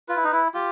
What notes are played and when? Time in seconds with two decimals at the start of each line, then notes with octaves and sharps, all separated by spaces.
0.09 F4 B4
0.16 E4
0.24 D#4
0.32 E4
0.54 F4 G4